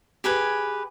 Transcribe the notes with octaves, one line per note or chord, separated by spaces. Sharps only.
G4 G#4 B4 G#5